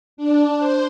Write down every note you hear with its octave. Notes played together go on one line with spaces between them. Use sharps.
D4
C5